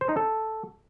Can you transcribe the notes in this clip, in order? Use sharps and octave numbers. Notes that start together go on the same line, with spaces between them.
C5
D#4
A4